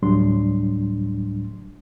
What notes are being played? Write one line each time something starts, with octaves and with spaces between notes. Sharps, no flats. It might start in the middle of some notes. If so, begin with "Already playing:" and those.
D2 A2 F#3 G3 D4 C6